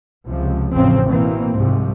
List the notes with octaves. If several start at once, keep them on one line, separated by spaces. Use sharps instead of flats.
C#2 C3 F3
A1 F2 C#3 F3 C4
B2 E3 A#3 C4
C2 G#2 C3 F3